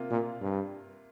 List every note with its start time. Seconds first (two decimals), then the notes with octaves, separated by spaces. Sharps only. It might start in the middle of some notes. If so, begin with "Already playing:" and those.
Already playing: C3 A#3 F4
0.10 A#2
0.41 G2